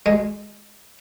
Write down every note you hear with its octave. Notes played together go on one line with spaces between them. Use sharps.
G#3